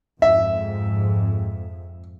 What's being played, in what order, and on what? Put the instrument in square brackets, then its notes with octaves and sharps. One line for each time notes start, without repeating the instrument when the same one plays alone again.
[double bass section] F2 G#2 [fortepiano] E5